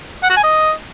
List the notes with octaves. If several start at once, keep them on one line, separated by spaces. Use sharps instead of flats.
F#5
F#4
G#5
D#5